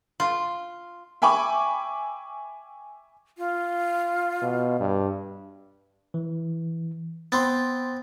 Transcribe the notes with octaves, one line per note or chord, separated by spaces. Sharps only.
F4
E5 G5 G#5 B5 C#6 D6
F4
B2
G2
E3
B3 C4 C6 A6